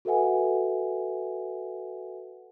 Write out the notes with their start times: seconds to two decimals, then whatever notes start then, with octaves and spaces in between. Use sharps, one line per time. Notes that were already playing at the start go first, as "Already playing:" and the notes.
0.05 F#4 A4 B4 E5 F#5 G#5